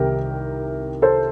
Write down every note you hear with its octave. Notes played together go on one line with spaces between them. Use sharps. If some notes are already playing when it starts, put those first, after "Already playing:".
Already playing: C2 C3 D#3 G4 A#4
A4 C5